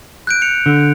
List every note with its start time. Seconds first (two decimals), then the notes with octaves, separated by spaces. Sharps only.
0.27 F#6 G6 D7
0.41 G6 C#7 F7
0.66 D3